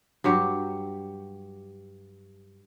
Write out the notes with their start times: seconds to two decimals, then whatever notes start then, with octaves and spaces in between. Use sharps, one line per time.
0.24 G2 F#3 G4